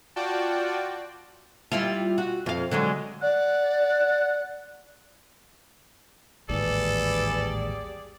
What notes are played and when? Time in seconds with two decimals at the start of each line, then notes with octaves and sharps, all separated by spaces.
0.16 F4 F#4 D5 G5 A5
1.72 G3 E4 F4
2.18 F#4
2.46 F2 F5
2.71 D3 F#3 G#3
3.22 D5 F#5
6.49 A1 D#2 G#2 E3 G3 G#4 A4 D5